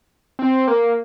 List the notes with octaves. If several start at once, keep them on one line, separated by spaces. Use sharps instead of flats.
C4
A#3